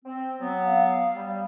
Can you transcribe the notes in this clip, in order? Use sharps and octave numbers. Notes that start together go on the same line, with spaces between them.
C4
F#3 B3
F5
G3